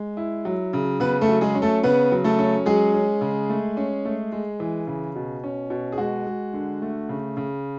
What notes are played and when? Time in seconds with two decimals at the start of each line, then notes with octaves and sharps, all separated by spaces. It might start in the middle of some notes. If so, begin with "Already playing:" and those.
Already playing: G#3
0.17 E4
0.45 F#3
0.73 C#3
1.00 C#3 B3 B4
1.21 A3 A4
1.29 F#3
1.41 G#3 G#4
1.55 C#4
1.62 A3 A4
1.83 C#3 B3 B4
2.12 F#3
2.24 A3 A4
2.39 C#4
2.66 F#3 G#3 G#4
2.94 C#4
3.21 C#3
3.50 A3
3.77 C#4
4.05 A3
4.32 G#3
4.60 E3
4.87 C#3
5.15 B2
5.44 C#4
5.70 B2
5.92 G#4
5.98 G#3 F#4
6.27 G#3
6.53 D3
6.82 A3
7.09 C#3
7.37 C#3